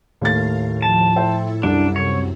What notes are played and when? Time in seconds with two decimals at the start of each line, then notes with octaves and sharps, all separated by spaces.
0.21 D#2 A2 A3 A#4 F5 A6
0.82 F3 A5
1.16 E4 A4 C5 E5 G5
1.63 C2 F#2 D4
1.96 C3 C4 C#5